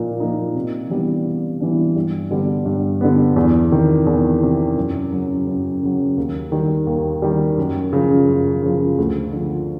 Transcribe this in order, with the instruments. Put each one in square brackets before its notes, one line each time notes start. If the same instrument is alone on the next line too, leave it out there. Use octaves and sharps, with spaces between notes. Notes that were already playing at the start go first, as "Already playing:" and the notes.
Already playing: [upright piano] A#2 F3 A#3 D#4
F3 A#3 D#4
C3
E3 G3 B3 D4
C3
E3 G3 B3 D4
G2
D3 G3 B3
G2
D3 G3 B3
E2
C3 D#3
E2
C3 D#3
F#2
C#3 F#3
F#2
C#3 F#3
D#2
D#3 G3
D#2
D#3 G3
F#2
C#3 F3
F#2
C#3 F3
D2
D3 F3